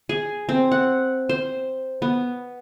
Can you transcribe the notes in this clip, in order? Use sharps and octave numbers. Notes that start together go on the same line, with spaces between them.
G#4
C4
F#5
C5
B3